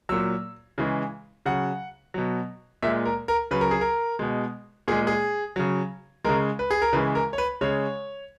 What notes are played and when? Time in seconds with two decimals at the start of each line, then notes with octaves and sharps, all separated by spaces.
0.09 A#2 F#3 E6
0.78 C#3 E3 G#3
1.46 C#3 F#3 F#5
2.14 B2 F#3
2.82 A#2 G#3 E5
3.05 A#4
3.28 A#4
3.51 C#3 F#3 B4
3.61 A#4
3.71 G#4
3.81 A#4
4.19 B2 G#3
4.88 A#2 G#3 G#4
5.07 G#4
5.56 C#3 F#3
6.25 C#3 G#3 A#4
6.59 B4
6.71 G#4
6.82 A#4
6.93 C#3 E3 G#3 B4
7.15 A#4
7.33 C#5
7.38 B4
7.61 C#3 G#3 C#5